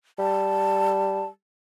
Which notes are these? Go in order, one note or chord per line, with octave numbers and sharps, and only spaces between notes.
G3 A5